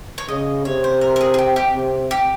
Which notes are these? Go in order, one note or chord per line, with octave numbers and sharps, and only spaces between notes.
C#5
C#3 D#5
C3 C#5
C5
A#4
A#4
G#4
G#4
G4
G4
C3
G4